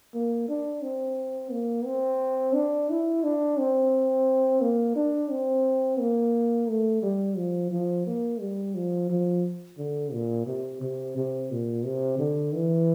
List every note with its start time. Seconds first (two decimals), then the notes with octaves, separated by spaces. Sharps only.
0.14 A#3
0.49 D4
0.83 C4
1.51 A#3
1.86 C4
2.54 D4
2.90 E4
3.24 D4
3.59 C4
4.61 A#3
4.95 D4
5.31 C4
5.99 A#3
6.69 A3
7.02 G3
7.37 F3
7.71 F3
8.06 A#3
8.40 G3
8.75 F3
9.10 F3
9.78 D3
10.13 A#2
10.47 C3
10.81 C3
11.17 C3
11.51 A#2
11.85 C3
12.19 D3
12.54 E3